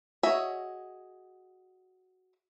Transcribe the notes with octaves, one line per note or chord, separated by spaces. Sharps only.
F#4 G#4 C#5 D#5 E5